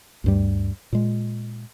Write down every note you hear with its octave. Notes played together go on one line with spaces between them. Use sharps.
D2 G2 G3
A#2 G#3